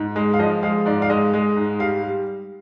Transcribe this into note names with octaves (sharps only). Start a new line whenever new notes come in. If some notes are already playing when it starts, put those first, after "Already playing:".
Already playing: G#2
G#3
F5
F3 D#5
G#3 F5
G#2 D5
F5
G#3 D#5
G#3
G#2
G3 F5
G3